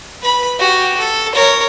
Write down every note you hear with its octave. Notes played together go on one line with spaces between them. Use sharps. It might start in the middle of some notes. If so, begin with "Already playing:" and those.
B4 B5
F#4 G4
A4
A#4 C#5